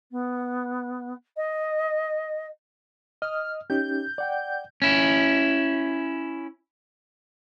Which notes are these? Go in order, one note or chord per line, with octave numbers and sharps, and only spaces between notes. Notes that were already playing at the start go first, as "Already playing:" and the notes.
B3
D#5
D#5 D#6 F6
C#4 D#4 G4 G6
D5 F#5 G5
C#4 E4